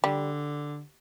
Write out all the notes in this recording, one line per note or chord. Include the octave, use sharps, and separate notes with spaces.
D3 G3